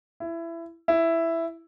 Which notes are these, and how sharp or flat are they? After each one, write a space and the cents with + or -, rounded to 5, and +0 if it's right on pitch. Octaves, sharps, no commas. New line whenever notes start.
E4 +20
E4 +5